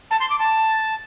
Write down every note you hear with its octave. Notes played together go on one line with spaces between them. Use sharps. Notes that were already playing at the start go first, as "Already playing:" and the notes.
A5
C6
D6
A5